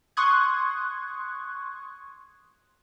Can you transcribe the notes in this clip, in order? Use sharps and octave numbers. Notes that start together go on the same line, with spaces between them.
C6 C#6 D#6 F#6 G#6